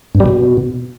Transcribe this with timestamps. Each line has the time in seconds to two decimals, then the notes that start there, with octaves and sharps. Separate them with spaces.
0.15 G2
0.20 G3
0.26 B2